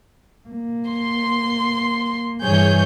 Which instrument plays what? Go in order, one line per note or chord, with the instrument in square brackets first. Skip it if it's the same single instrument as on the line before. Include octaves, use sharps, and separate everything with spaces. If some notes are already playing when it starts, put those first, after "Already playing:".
[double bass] A#3
[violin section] C6
[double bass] G2 E3 [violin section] G#4 C#5 G6